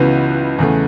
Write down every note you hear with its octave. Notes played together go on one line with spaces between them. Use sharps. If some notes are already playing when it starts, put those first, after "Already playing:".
Already playing: C#2 C#3 E3 B3 F#4 B4
E2 C#3 A3